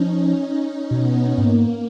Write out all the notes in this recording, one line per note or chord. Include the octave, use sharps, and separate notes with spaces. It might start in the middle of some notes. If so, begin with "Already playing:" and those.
Already playing: F3 C#4 D#4
D#4
C#4
B2 B3
G#2 A#3